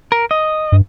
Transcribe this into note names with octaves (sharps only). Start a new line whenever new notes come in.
A#4
D#5
G2